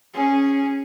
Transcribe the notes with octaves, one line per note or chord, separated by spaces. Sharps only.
C#4 G#4